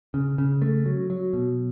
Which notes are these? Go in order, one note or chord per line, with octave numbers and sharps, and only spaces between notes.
C#3
C#3
A3
F#3
F#3
B2